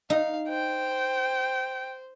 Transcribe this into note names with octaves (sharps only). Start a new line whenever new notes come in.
D#4 F5
C5 G5